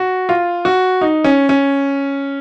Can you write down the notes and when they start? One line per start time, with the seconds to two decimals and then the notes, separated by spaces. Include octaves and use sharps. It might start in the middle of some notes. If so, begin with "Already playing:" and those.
Already playing: F#4
0.29 F4
0.65 F#4
1.01 D#4
1.24 C#4
1.49 C#4